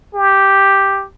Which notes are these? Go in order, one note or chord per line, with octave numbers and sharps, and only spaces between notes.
G4